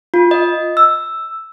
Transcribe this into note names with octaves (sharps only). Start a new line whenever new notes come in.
F4
D#5
E6